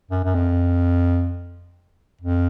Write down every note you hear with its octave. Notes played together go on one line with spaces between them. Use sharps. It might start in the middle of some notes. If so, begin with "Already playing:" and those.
F#2
F#2
F2
F2